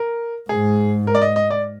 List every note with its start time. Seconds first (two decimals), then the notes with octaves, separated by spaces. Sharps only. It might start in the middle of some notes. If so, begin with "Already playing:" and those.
Already playing: A#4
0.49 G#2 G#4
1.07 A#4
1.15 D5
1.22 D#5
1.36 D#5
1.50 D5